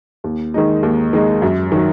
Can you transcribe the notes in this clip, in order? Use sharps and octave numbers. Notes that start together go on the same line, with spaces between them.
D#2
D#3 G#3 D#4
D#2
D#3 G#3 D#4
F#2
D#3 F#3